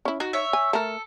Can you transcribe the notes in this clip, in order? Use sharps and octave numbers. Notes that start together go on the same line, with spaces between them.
C#4 E4
D#4 F#4
C#5 E5
G#5
A3 A4 A#4